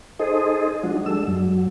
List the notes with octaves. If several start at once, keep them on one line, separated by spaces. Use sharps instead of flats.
D#4 G#4 A4 C5 D#5
F3 G#3 D4 D#4 F#4
G3 G#3 D4 A4 E6
F#2 F#3